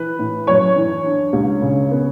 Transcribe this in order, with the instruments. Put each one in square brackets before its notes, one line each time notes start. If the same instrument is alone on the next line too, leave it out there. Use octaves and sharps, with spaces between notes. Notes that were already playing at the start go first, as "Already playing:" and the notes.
Already playing: [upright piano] E3 [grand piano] B4
[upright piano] A2
[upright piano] F#2 [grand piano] C#5 C#6
[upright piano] E3
D4
C#2
C#3
B3